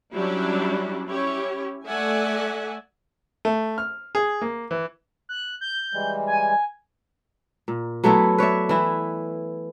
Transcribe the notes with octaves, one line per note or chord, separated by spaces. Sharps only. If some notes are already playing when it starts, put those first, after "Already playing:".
F#3 G3 C#4 D4 E4 G4
C#4 E4 G4 C#5
A3 D5 E5 F#5 G#5
A3
F6
G#4
A#3
E3
F#6
G6
E3 G3 G#3
G#5
A#2
F#3 A3 B3 E4
B4 C#5 D5 E5
E3 E4